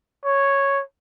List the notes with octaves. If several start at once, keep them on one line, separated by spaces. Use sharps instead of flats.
C#5